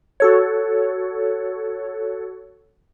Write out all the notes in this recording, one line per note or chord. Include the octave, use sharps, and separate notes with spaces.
F#4 A4 C#5